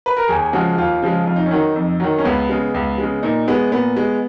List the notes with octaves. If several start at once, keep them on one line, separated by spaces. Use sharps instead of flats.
B4
A#4
D#2 G#4
C#3 F3 G#3 F#4
D#2 F4
C#3 F3 G#3
F2 F4
D#4
C#4
D#3 F#3 D#4
F2
D#3 F#3
C#4
C#2 B3
C#3 G#3
C#2
C#3 G#3
A#2 D#4
G#3 B3
A#2 B3
G#3